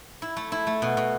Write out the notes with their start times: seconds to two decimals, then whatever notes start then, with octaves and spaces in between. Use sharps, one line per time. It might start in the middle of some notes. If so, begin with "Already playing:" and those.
0.22 E4
0.37 A3
0.52 E4
0.67 A3
0.82 B2
0.97 B2